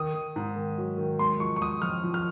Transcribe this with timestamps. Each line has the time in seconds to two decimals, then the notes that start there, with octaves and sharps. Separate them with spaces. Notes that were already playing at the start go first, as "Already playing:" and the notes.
Already playing: D#3 D#6
0.14 D#3
0.36 G#2
0.56 D#3
0.78 F#3
0.98 D#3
1.19 G#3 C6
1.40 F3 C#6
1.56 C#6
1.61 G#3 D#6
1.82 F2 F6
2.04 F3
2.14 F6